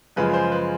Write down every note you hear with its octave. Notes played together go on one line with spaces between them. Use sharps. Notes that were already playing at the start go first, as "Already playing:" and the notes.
F#2 C#3 F3 G#3 B4
C5
B4